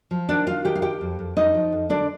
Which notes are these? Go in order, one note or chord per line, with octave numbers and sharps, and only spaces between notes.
F3
D#3 D4 D5
D#3 F4 F5
D#3 G4 G5
F5
D#3 G4 G5
F2
F2
F2 D#4 D#5
F3
F2
D3 D4 D5